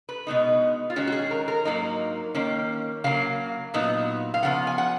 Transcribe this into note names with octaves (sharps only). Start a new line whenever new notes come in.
B4
B2 G#3 B3 D#4
F4
D#3 G#3 C#4 F#4
F#4
G#4
A#4
A#4
G#2 F#3 A#3 D#4
D#3 A#3 C#4
C#3 F#3 A#3 F5
A#2 F#3 B3 D#4
F5
C#3 F3 B3 F#5
G#5
F#5